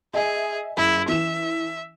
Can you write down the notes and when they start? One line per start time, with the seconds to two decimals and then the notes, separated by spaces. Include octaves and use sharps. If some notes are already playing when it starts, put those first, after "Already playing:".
0.14 G#4 D#5 E5 G#5
0.77 F#1 E4
1.08 E3 E5 E7